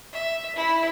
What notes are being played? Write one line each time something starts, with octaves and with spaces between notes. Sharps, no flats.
E5
E4